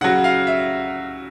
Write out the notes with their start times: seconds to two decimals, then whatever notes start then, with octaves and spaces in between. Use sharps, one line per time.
0.01 C#3 F#3 F#5
0.24 F5
0.47 E5